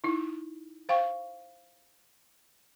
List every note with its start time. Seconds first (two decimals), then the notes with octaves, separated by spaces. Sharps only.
0.04 D#4 E4
0.89 C5 F5 G5 C#6